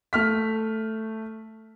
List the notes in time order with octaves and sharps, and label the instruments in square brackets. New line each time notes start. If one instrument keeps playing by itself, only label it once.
[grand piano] A3 F6 B6